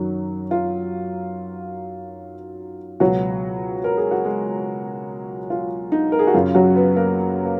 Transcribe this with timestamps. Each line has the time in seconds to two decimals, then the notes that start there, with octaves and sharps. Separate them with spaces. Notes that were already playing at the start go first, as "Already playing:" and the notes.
Already playing: F#2 D#3 F#3 F#4
0.51 F4
3.00 C#2 B2 F#3 F#4
3.84 A#4
3.97 G#4
4.11 F#4
4.24 G#3 G#4
5.50 F4
5.92 D#4
6.12 A#4
6.19 G#4
6.27 F#4
6.34 F#2 C#3 F4
6.55 F#3 F#4
6.75 B3 B4
6.96 A#3 A#4
7.45 A#3